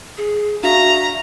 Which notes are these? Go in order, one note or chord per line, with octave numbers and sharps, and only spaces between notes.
G#4
D4 F#4 E5 F5 A#5